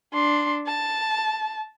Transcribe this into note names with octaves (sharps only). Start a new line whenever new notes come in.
D4 C6
A5